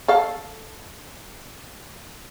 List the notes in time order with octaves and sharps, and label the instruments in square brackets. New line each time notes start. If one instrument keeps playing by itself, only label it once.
[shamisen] A4 F5